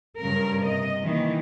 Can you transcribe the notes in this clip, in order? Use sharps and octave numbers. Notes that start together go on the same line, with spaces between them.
G2 C#3 A#4
C3 D#5
D#3 E3 A#3